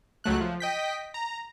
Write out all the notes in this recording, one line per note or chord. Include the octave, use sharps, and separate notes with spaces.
C#2 F#3 A3 F#6
F3
D#5 G5 B6
A#5